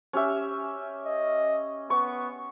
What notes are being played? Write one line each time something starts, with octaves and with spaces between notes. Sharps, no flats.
C#4 G4 E5
D#5
B3 C#6